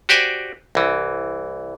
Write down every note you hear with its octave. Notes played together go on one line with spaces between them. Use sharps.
F#4 G4 C5 D5 G#5
C2 E3